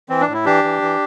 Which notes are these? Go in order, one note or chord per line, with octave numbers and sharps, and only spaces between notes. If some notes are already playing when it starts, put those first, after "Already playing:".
E3 C4
D4
A2
E4
E3 D4 G4
E3
E3